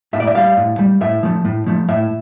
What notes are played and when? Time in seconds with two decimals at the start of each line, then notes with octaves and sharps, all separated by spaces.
0.13 A2 E5
0.20 D5
0.27 E5
0.35 G3 F5
0.57 A2
0.79 G3
1.01 A2 E5
1.23 F3 A3
1.45 A2
1.66 F3 A3
1.89 A2 E5